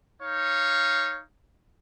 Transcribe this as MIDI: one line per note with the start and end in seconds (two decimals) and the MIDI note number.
0.22 1.20 63
0.22 1.20 73
0.22 1.20 77